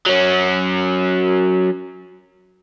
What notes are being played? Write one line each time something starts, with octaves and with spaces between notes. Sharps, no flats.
F#3 C#4